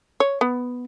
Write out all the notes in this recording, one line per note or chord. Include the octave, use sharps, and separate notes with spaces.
C#5
B3